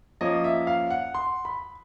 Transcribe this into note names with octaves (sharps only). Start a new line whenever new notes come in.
F3 A#3 C#4 D#5
E5
F5
F#5
C6
B5